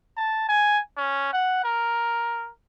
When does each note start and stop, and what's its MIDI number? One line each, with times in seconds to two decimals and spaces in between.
0.17 0.47 81
0.49 0.80 80
0.97 1.32 61
1.33 1.63 78
1.64 2.50 70